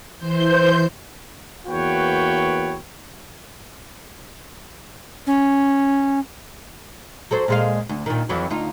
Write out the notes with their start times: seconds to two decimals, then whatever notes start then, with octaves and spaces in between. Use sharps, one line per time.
0.18 E3 C5 C6 G6
1.67 E2 A#3 F#4 B4 C#5 G5
5.27 C#4
7.31 F#3 A4 C5
7.48 A#2 G#3 F5
7.89 D2
8.06 A#2 D#3
8.29 F2 E3 F#3
8.50 D2 D#4 F4